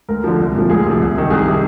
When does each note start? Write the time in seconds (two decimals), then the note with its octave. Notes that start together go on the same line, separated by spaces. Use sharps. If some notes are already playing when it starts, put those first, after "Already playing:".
0.08 D2 A#4
0.24 D3 F3
0.39 C2
0.55 A#2 F3
0.70 D2 G#4
0.85 C3 F3
1.00 C2
1.15 C3 D#3
1.30 C2 G#4
1.47 C3 D#3